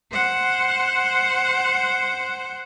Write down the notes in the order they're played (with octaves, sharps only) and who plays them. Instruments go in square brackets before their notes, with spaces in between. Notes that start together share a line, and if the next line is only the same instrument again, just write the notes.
[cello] C5 F#5